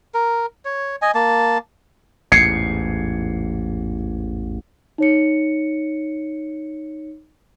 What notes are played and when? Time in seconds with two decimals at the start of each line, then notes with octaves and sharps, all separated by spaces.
0.14 A#4
0.65 C#5
1.02 D#5 G#5
1.15 A#3 A5
2.32 A1 E2 G#2 G#6 C7 C#7
4.98 D#4 C#5 C#7